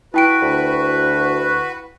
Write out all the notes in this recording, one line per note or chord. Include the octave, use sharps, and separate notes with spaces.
E4 F#4 B4 G5 D7
D2